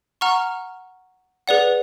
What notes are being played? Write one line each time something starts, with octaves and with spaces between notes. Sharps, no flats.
F#5 A#5 C#6 F6
G#4 B4 D5 F#5